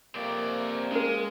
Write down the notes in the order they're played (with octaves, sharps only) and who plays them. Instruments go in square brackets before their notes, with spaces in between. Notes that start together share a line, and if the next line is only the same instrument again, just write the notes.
[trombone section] F2 C3 A#3 [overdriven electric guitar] C4 D5
[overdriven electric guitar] G#3 [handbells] C#4 A#4